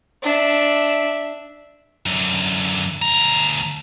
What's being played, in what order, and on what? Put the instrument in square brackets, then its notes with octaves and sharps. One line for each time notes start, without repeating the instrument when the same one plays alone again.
[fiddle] D4 E5
[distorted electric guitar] F#2 D3
D2 A#5